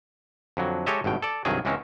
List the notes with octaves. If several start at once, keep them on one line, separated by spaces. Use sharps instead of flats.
F2 D3 F#3
G#3 G4 A4 C#5 D#5 E5
G#1 G2 B2 G5
A4 D5
C2 G2 D#3 F#3 G#4
C#2 E3 G#3 C4 C#4